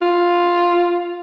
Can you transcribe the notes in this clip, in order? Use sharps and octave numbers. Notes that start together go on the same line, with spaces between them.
F4